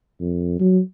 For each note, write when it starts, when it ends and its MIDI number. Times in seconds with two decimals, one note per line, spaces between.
0.20 0.56 41
0.60 0.79 54